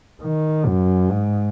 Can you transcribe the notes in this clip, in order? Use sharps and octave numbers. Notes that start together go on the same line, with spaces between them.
D#3
F#2
G#2